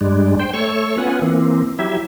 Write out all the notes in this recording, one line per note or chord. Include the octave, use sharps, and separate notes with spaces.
G2 G3 G#3 D4
C5 G5
A3 C#5 C#6 E6
B3 C#4 F4 B4 F#5 G#5
E3 A#3 C4
F#3 E4 G4 E5